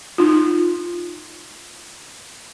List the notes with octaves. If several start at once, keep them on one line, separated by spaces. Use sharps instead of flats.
D#4 F4